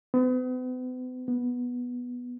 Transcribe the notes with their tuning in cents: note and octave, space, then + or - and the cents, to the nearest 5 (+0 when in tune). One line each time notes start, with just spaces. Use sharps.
B3 +45
B3 -5